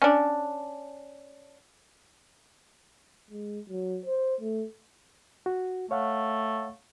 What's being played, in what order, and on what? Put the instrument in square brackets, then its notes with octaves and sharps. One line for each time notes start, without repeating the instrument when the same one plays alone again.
[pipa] C#4 D4
[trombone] G#3
F#3
C5
A3
[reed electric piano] F#4
[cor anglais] A3 [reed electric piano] C#5 F5 F#5